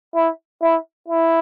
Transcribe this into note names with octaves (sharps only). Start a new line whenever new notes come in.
E4
E4
E4